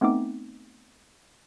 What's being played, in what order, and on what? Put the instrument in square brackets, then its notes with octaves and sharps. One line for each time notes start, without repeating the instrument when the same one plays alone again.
[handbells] A3 B3 C4 D#4 D6